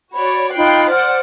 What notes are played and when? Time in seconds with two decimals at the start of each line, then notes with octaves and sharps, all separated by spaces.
0.13 F#4 C#5 D5 B5
0.57 D#4 F4 G5 B5 F#6 C7
0.90 C5 D5 F#5 F6